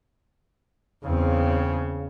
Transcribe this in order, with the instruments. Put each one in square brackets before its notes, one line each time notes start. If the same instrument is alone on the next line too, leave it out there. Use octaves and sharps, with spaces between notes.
[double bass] E2 C4 [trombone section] C#3